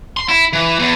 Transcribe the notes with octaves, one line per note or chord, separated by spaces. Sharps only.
C6
E4
E3
E2